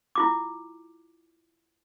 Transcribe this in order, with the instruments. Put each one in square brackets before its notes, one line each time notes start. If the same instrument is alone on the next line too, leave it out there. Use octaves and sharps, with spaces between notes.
[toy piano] E4 F4 D6